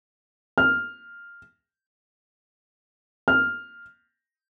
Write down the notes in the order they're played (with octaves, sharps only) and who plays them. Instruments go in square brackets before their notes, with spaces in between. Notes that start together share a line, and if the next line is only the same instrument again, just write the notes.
[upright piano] F6
F6